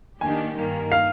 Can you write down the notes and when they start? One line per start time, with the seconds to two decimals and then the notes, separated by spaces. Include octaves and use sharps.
0.21 D#3 A#3 D4 G4 G#5
0.56 G2 D#3 A#3
0.92 F5